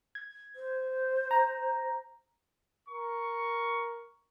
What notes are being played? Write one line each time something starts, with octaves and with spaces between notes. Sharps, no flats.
G#6
C5
A#5
A#4 C#6